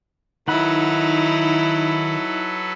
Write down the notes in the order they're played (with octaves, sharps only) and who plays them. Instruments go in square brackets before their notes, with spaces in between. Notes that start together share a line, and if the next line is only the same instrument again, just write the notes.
[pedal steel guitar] D#3 F#5 B5 [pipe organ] F#3 A4 B4 [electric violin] D#4 E4